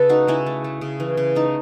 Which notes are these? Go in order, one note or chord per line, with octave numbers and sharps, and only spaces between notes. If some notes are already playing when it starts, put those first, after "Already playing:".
Already playing: C#3 A4 B4
A3 D#4 F#4
C#3 C#4 E4
A3
A3
C#3
E3
C#3
A3 D#4